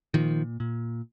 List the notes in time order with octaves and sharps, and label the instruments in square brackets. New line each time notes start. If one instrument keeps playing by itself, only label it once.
[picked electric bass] A#2 D#3 F3
A#2